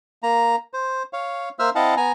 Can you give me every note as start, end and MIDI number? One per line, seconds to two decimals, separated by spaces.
0.23 0.56 58
0.23 0.56 82
0.73 1.03 72
1.13 1.49 73
1.13 1.49 77
1.59 1.70 58
1.59 1.70 72
1.59 1.70 76
1.59 1.70 88
1.59 1.70 89
1.75 1.95 60
1.75 1.95 64
1.75 1.95 75
1.75 1.95 77
1.75 1.95 78
1.75 1.95 81
1.97 2.12 59
1.97 2.12 80
1.97 2.12 82